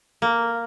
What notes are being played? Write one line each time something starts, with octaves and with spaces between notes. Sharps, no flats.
A#3